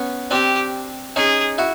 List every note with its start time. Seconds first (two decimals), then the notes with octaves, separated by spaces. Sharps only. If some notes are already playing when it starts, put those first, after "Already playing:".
Already playing: B3 C#4
0.31 C4 D4 G4
1.16 C#4 D#4 G#4
1.58 E4 F#4